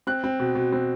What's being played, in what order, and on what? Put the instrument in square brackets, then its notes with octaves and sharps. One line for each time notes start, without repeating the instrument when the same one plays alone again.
[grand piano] C4 F#6
C4
B2
B2
C4